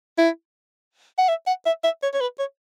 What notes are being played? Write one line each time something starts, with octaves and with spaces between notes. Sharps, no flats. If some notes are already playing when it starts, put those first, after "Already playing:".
E4
F#5
E5
F#5
E5
E5
C#5
C#5
B4
C#5